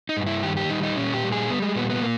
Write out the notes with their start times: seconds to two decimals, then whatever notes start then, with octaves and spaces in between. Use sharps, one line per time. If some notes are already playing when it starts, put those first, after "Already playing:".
0.09 D#4
0.17 G2
0.27 E4
0.43 D#3 G4
0.57 G4
0.70 G3 D#4
0.83 D#4
0.97 A#2 C#4
1.14 G4
1.24 G3
1.32 G#4
1.50 G3 B3
1.62 G#3
1.75 A#2 B3
1.90 B3
2.02 A#3